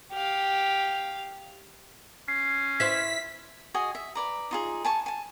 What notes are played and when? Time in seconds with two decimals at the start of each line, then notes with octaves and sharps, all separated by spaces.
0.12 G4 F5
2.28 C#4 C7
2.80 E4 B4 C5 B6
3.74 F#4 G#4 D#5 G#5
3.95 E5
4.15 B4 D5 A#5
4.51 D#4 F4 G#4
4.85 G#5 A5 C#6
5.06 G#5 A5